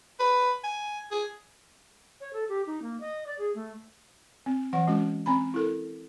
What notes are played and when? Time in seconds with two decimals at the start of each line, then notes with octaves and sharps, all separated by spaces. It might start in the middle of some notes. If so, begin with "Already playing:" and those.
0.20 B4
0.64 G#5
1.11 G#4
2.21 C#5
2.33 A4
2.49 G4
2.67 D#4
2.82 A#3
3.00 D#5
3.26 D5
3.39 G#4
3.55 A3
4.46 C4
4.73 E3 F#3 F#5
4.87 G#3 C#4 F#4
5.26 C4 A#5 B5
5.54 E4 A4 A#4